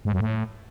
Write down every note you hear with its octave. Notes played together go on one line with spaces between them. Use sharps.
G#2
F#2
A2